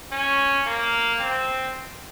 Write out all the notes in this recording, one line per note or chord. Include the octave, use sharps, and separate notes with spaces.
C#4
A#3
C4